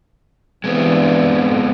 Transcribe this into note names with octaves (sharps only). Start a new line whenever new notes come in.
G2 E3 G#3 B3 C4
F2 A2